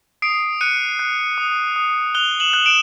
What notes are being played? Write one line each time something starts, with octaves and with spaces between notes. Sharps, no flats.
D#6 C7 D7
F#6 C#7 D#7
F#6
D#6
D#6
F#6 F7 G7
E7 F#7
F#6
D7 E7